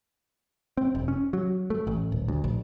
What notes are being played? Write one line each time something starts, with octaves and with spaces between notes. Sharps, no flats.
C4
F1
C#4
F#3
A3
A1
D#1
D2
A#1